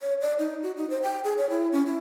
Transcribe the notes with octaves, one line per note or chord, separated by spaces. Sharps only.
C#5
D5
D#4
F#4
D#4
C5
G5
G#4
C#5
E4
C#4
E4